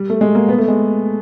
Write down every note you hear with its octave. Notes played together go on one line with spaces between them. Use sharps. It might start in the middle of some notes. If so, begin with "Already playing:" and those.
Already playing: G3
A3
G#3
A#3
B3
A3
G#3